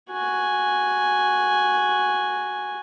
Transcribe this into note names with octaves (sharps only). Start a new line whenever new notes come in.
F#4 G#5